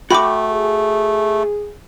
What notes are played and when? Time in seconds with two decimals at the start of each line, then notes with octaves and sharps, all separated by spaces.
0.11 A3 F#4 G5 B5 D6
0.52 G#4